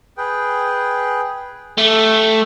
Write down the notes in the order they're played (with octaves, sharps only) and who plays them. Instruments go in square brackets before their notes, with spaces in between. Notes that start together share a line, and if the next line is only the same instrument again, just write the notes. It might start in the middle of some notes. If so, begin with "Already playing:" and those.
[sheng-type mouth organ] G#4 B4 G5
[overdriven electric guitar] A3 [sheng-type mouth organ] G4